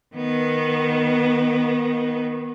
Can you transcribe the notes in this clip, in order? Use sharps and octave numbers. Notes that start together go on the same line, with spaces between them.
D#3 B3